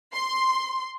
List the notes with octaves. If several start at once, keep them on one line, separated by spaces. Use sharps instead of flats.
C6